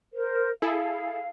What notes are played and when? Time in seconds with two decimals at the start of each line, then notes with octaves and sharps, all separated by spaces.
0.13 A#4 C5
0.62 E4 G#4 A4 F5